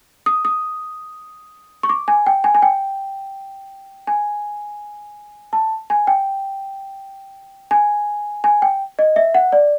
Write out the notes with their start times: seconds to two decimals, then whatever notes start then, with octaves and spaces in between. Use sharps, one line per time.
0.26 D#6
0.45 D#6
1.83 C#6
1.89 D6
2.08 G#5
2.26 G5
2.44 G#5
2.55 G#5
2.62 G5
4.07 G#5
5.53 A5
5.90 G#5
6.07 G5
7.71 G#5
8.44 G#5
8.62 G5
8.99 D#5
9.16 E5
9.34 F#5
9.52 D5